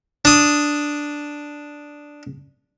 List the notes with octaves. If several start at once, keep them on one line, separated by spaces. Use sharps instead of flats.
D4 D#6